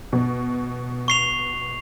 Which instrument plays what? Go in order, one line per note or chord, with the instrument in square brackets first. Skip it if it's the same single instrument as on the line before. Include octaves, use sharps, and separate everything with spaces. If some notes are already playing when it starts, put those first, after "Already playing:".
[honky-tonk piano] B2
[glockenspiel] C#6 C7 F7